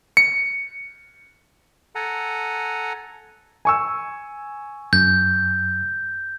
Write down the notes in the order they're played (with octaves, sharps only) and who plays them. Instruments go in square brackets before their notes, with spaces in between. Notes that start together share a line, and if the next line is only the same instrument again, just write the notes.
[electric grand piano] C#7
[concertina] A4 F#5 G#5 A#5
[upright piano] G#5 C#6 E6
[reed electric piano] F#2 [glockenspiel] G6